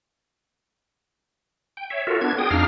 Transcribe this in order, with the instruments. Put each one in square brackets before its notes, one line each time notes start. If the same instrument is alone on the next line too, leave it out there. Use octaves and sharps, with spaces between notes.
[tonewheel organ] G5
C#5 E5
F4 F#4 A4 A#4
B3 D4 G#6
G#4 G5 D#6
F2 D4 D#4 F5 F6